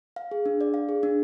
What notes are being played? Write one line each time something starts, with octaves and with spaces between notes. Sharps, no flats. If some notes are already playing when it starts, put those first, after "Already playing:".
F5
G#4
D4
D5
F5
G#4
D4